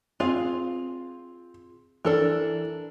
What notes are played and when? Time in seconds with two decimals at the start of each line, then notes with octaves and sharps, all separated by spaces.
0.20 C4 F4 G#4 F5
2.05 E3 D4 A4 A#4